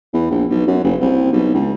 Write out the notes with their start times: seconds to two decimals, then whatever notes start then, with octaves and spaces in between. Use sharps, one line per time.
0.13 E2
0.30 A#1
0.50 B1
0.67 F#2
0.84 F#1
1.01 C2
1.32 B1
1.54 C#2